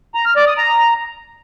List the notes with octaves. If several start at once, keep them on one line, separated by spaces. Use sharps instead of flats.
A#5
F6
D5
D#6
A#5